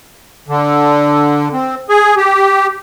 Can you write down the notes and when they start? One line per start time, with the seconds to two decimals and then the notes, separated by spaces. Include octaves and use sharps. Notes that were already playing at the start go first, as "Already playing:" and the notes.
0.49 D3
1.53 C4
1.89 G#4
2.17 G4